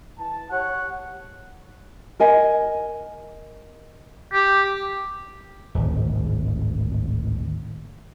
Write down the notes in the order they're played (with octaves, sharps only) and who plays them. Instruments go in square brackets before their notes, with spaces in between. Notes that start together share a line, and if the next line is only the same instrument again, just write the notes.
[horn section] E3 A5
[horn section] G4 C#5 [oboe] F#5
[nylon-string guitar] A#4 D#5 G#5
[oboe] G4
[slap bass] D1 G#1